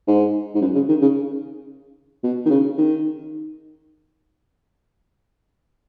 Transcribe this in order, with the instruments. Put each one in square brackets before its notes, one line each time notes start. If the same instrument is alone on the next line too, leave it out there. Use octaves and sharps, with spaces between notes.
[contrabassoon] G#2
G#2
F#2
C#3
D#3
C#3
B2
D#3
C#3
D#3